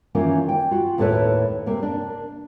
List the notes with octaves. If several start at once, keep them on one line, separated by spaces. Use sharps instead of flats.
D#3 E3 A#3 C#4 F4
G5
F4 F#4
D#2 A2 E4 A4 B4 C#5
C3 A#3
D4 A#4